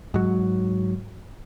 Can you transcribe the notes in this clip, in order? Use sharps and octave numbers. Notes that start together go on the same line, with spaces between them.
G#2 F#3